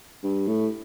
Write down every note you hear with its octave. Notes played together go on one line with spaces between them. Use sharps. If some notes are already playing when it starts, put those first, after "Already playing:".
G2
A2